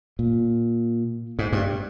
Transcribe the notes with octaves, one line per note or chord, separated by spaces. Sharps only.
A#2
G#2
G2